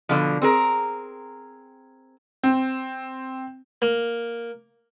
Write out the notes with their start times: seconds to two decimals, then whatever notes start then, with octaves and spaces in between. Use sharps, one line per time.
0.09 B2 D3 F3
0.42 C4 G#4 A#4
2.43 C4
3.82 A#3